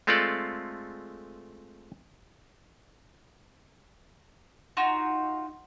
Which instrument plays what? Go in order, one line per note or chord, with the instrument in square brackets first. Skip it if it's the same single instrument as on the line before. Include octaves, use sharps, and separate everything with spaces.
[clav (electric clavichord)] G#3 A3 C4 F4 A4 D5
[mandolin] D#4 F4 F#4